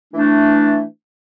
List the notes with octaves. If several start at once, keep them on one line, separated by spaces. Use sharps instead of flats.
E3 A3 D4